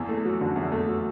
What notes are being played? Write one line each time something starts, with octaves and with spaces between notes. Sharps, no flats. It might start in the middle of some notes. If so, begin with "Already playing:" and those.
Already playing: E2 E3
A3
F#3
D3
E2
A3
F#3